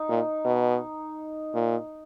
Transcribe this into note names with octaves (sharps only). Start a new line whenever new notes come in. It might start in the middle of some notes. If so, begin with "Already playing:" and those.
Already playing: D#4
A#2
B2
A#2